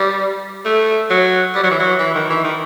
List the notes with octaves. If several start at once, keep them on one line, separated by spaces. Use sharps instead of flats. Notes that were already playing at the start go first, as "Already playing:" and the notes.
Already playing: G3
A3
F#3
G3
F#3
E3
F#3
E3
D#3
E3
D#3